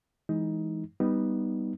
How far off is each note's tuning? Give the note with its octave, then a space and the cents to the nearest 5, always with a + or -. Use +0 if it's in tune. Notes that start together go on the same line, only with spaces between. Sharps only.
E3 +5 G#3 +10 D#4 +15
G3 +0 B3 +0 D#4 +0